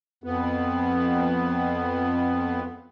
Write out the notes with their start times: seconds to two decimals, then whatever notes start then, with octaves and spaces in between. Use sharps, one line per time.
0.24 F2 B3